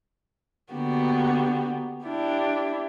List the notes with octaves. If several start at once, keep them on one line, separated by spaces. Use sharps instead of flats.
D3 A#3 B3 F#4 G4
D4 E4 G4